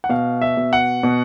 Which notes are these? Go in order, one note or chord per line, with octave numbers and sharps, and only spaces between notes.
F#5
B2 F5
E5
B2
F#5
B2